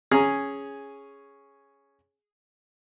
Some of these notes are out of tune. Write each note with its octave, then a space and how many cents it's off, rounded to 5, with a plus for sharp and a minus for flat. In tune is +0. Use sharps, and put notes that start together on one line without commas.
C#4 +0 G#4 +0 A#5 +0